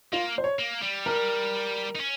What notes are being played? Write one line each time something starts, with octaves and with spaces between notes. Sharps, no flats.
A#3 F4
C5
C#5
A#3
G3
A#4
D#4
C#4